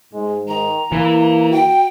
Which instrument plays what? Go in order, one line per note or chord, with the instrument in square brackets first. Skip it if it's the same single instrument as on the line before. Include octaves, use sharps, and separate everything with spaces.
[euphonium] G#2 [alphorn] G#3
[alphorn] D#3 [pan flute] A#5
[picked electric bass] E3 [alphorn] A#3 [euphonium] E4
[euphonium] F#4 [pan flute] G5